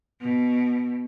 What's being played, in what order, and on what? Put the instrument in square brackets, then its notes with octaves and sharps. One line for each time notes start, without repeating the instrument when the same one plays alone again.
[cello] B2